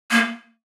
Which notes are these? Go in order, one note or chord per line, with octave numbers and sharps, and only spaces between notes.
A#3